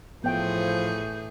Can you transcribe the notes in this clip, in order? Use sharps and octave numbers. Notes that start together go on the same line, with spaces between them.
A2 E3 F3 B3 G#4 G5 G6